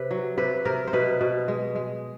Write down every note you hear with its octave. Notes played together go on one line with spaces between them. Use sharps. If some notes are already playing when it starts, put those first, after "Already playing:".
Already playing: C3 B4
F#3
C3 B4
C3 A#4
C5
B2 B4
B2
G#3
G#3